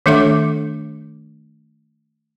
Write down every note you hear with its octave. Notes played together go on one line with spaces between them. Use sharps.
D#3 A3 D4 A4 E5 D6